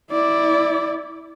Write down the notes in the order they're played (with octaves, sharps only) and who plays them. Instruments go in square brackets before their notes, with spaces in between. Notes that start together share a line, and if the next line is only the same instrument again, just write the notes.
[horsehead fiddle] E4 D5